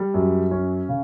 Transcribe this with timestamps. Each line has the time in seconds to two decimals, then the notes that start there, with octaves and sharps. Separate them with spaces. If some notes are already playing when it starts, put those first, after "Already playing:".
Already playing: G3
0.14 F#2
0.51 C#4
0.89 C#3